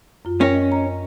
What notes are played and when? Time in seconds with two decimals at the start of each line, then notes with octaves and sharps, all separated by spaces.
0.25 F#2 F4
0.41 C#4 A#4 G5 A#6
0.54 D#5
0.72 D#5 A#5